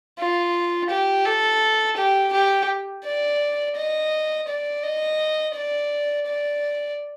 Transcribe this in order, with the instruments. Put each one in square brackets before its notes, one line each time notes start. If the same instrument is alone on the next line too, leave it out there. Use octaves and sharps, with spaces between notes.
[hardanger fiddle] F4
G4
A4
G4
G4
D5
D#5
D5
D#5
D5
D5